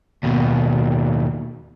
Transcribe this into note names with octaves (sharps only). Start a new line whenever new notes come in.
D#2 B2